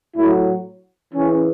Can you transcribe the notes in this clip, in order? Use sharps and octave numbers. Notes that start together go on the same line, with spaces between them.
A2 F#3 E4
C#3 E3 C#4